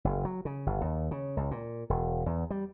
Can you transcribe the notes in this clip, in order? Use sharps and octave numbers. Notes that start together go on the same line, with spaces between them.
F#1
F#3
C#3
G1
D#2
C#3
C#2
A#2
E1
E2
G3